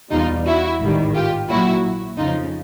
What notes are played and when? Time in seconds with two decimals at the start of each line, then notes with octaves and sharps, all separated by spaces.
0.12 E2 B2 G3 D#4 F4
0.46 E4 F#4
0.80 A1 G#2 D#3 G3
1.15 F4 G4
1.50 A#1 A#2 F#3 E4 F#4
2.18 F2 C#3 F3 D#4 F4